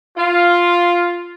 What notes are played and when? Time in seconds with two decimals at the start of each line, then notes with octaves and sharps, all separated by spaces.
0.17 F4